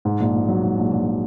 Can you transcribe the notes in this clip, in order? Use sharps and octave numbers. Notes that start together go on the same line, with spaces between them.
G#2
A#1
A#1
F#3
G#2
A#1
A#1
F#3